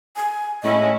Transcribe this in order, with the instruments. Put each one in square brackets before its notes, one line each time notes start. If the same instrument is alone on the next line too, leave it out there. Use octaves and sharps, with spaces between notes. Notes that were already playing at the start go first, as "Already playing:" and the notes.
[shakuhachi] G#5
[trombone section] A2 [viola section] G#3 C#4 E4 [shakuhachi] D#5